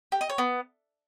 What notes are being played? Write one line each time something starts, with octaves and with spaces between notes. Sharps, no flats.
G4
D#5
C#5
B3